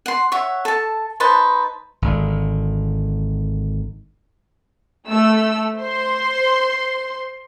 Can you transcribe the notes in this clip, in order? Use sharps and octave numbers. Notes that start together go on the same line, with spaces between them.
F#5 C6
C#5 E5 F#5
A4 A5
D#4 B4 C5 A5
G#1 D3
A3 E6
C5 C6